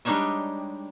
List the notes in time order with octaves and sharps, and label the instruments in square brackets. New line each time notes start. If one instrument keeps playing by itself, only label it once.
[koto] G3 G#3 D4 D#4 C#5 E5